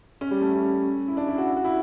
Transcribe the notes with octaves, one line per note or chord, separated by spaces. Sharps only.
C#4
G3
A3
C#4
E4
D4
E4
F#4
F#4
E4